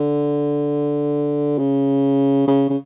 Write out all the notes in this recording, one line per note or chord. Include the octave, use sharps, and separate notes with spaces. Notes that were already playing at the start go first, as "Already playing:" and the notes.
Already playing: D3
C#3
C#3
C#3